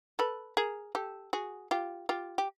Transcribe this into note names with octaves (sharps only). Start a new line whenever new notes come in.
A4 B4
G#4 A#4
G4 A4
F#4 G#4
F4 G4
F4 G4
G4